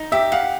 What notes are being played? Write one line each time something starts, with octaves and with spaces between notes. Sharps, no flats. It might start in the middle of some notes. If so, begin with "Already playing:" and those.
Already playing: D#4
G4 E5
F5 F#5